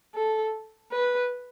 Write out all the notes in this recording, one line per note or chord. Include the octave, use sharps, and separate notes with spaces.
A4
B4